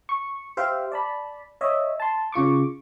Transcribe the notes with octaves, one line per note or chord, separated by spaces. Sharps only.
C#6
G4 C5 E5 F5 G5
D5 A5 B5
C#5 D#5 E5
A5 C6
C#3 F4 C#6 D6